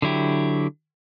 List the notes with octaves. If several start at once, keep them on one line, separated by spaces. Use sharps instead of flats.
D3 F#3 E4 G4